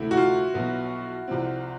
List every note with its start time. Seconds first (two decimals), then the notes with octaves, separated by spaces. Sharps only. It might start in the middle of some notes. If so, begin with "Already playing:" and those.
Already playing: D2 C3 E3 A3 E4
0.11 F#4
0.17 F4
0.54 B1 B2 F#3 B3 E4
1.28 C2 C3 F3 G#3 C4